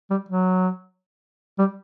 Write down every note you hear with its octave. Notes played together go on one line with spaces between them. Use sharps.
G3
F#3
G3